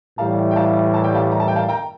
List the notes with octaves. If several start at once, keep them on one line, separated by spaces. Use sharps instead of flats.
A2 E3 G3 F5 A5
G5
F5 A5
A5
G5
F5 A5
A#5
A5
G5
F5 A5
G5 A#5